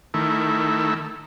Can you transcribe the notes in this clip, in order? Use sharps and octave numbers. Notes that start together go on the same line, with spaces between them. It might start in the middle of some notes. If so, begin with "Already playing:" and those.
D#3 A3 E4